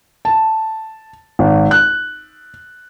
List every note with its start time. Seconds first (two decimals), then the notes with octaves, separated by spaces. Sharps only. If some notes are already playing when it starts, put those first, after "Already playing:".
0.25 A5
1.39 G#1
1.71 F#6